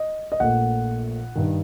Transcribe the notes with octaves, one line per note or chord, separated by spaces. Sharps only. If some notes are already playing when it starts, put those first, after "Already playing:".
Already playing: D#5
D#5
A#1 A#2 A3 F#5
G2 D#3